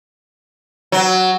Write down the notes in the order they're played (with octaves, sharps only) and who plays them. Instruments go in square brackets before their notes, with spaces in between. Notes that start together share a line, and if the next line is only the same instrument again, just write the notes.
[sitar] F#3